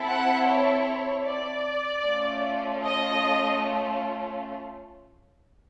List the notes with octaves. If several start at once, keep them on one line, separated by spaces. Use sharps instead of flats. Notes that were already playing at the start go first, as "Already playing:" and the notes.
Already playing: C4 E4 A4
F#5
C#5
D5
A3 C#4 F4
D#5